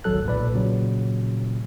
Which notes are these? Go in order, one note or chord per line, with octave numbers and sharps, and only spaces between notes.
G#1 C#2 F#3 A4 F#6
B1 A#2 B4 D5
A#2 C#3 F#3